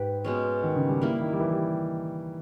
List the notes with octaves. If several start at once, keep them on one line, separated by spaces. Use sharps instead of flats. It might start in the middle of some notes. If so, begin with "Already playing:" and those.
Already playing: G#2 G4 B4
B2 G#3 C#4
D#3
C#3
G3
G3 A#3 E4 A#4
D#3
G3
E3
G3